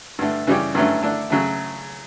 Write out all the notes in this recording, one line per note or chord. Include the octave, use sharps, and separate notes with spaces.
G2 D3 A3
C#3 E3 G3 C#4 G4
G2 D3 F#3 A3 C#4
D3 A3 D4
C#3 F#3 A3